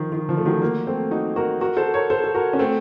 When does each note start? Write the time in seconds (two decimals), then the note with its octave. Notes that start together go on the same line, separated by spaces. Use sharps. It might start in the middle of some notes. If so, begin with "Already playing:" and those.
Already playing: D#3 F3
0.12 D#3
0.29 F3
0.37 A3
0.45 D#3 F#3
0.62 F#3 A#3
0.87 A3 C4
1.11 D#4 F#4
1.36 F#4 A#4
1.60 F#4 A#4
1.77 A4 C5
1.94 A#4 C#5
2.10 A4 C5
2.24 A4
2.34 F#4 A#4
2.53 C#4
2.59 A3 C4